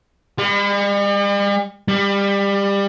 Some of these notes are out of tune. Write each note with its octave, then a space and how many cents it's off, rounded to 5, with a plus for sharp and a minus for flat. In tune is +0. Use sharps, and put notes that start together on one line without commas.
G3 +45
G3 +25